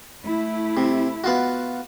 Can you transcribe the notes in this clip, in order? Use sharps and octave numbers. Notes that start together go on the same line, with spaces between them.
A3 E4
C3
B3 F4 F#4